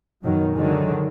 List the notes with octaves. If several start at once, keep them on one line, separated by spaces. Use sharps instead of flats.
F#2 B2 D#3 F#3
D3 D#3 F#3 G#3